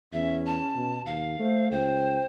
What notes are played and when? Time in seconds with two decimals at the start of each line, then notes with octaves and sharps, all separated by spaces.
0.13 E2 C#4 E5
0.46 A5
0.76 B2
1.06 D#2 F5
1.39 A3 C5
1.71 C#2 C5 G5